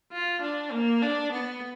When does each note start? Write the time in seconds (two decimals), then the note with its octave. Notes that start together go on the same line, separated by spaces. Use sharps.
0.12 F4
0.42 D4
0.72 A#3
1.02 D4
1.32 B3